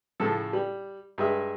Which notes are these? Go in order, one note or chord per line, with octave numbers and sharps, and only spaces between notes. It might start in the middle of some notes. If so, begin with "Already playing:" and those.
A2 C#3 F3 A4
G3
G2 G#3 E5